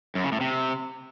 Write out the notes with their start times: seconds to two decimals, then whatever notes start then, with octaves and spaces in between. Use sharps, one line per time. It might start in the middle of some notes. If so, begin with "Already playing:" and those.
0.15 F#2
0.24 C#3
0.32 A2
0.41 C3